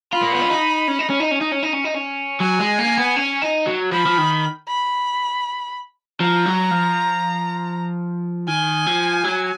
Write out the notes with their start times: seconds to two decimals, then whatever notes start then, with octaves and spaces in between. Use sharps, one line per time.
0.13 F4 B5
0.22 A#3
0.32 B3
0.41 C#4
0.50 D#4
0.88 C#4
0.99 D#4
1.10 C#4
1.20 D#4
1.32 C#4
1.41 D#4
1.52 C#4
1.64 D#4
1.74 C#4
1.85 D#4
1.95 C#4
2.40 F#3 G#5
2.59 G#3
2.79 A#3
2.98 B3
3.16 C#4
3.42 D#4
3.67 F#3
3.92 F3 B5
4.06 F3
4.18 D#3
4.68 B5
6.20 F3 A#5
6.46 F#3
6.71 F3
8.48 D#3 G#5
8.86 F3
9.24 F#3